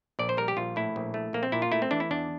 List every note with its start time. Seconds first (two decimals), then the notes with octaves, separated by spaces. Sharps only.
0.19 A#1 D5
0.29 C5
0.37 G3 A#4
0.48 G4
0.57 A#1 F4
0.76 A2 E4
0.96 A#1
1.14 A3
1.33 A#1 A#3
1.43 C4
1.52 A#2 E4
1.62 F4
1.72 A3 E4
1.82 C4
1.91 E3 D4
2.00 E4
2.11 E2 D4